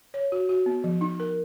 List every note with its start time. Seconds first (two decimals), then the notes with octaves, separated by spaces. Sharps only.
0.14 C#5
0.32 F#4
0.49 F#4
0.66 B3
0.84 F3
1.01 D#4
1.20 A#4